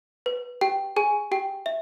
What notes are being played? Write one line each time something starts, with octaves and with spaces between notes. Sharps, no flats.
B4
G4 G5
G#4 G#5
G4 G5
E5